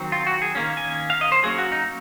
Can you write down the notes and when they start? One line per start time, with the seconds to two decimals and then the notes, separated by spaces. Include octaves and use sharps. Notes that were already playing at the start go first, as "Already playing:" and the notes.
Already playing: D#3 F#3 C4
0.12 F4
0.27 F#4
0.42 G#4
0.55 D#3 A#3 C#4
0.77 G#5
1.10 F5
1.21 D#5
1.32 C5
1.43 F#3 A#3 C#4 G#4
1.58 F#4
1.72 D#4